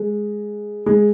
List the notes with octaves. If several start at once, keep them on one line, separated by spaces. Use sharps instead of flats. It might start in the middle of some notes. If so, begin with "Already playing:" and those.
Already playing: G#3
G#3